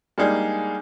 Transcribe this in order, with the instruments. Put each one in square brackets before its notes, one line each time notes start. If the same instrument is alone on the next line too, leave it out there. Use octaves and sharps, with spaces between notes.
[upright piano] G3 G#3 A#3 D4 D#4 G#4